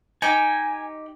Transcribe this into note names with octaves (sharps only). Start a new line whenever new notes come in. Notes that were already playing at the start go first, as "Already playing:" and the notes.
D#4 G4 G#5